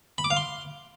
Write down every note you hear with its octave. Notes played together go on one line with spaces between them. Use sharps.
B5
D6
F5
C6